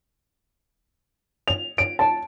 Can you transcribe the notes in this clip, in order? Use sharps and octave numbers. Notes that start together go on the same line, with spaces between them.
F7
D7
A5